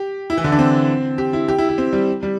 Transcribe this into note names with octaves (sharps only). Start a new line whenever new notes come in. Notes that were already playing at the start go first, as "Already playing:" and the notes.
Already playing: G4
E4
E3
D3
D4
C4
G4
E4
G4
E4
E4
C4
G3
G3